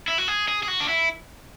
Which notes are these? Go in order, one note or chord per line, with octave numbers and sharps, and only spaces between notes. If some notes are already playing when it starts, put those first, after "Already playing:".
E4
F#4
G#4
G#4
G#4
F#4
D4
E4